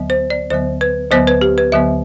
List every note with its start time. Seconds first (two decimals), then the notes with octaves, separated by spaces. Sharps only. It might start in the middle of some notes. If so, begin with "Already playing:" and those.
Already playing: D2 D3 F#3 B3
0.10 C5
0.30 D5
0.50 D2 D3 F#3 B3 C5
0.81 B4
1.11 D2 D3 F#3 B3 C5
1.27 B4
1.41 G4
1.58 B4
1.72 D2 D3 F#3 B3 E5